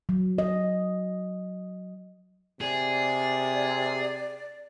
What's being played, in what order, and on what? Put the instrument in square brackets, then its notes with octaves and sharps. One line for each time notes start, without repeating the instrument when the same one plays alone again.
[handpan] F#3
D#5
[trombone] C3 [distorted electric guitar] G#4 [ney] D5